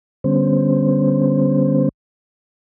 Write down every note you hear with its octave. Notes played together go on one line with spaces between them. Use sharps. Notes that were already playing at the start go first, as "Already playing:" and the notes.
D3 G3 B3 C#4 C5